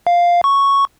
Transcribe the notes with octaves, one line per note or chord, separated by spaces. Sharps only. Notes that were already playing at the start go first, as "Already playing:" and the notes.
F5
C#6